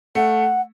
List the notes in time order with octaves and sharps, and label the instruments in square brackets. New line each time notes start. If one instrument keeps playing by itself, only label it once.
[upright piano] A3 [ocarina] F#5